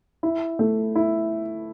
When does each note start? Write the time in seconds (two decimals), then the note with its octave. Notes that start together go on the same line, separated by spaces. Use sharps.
0.23 E4
0.59 A3
0.95 E4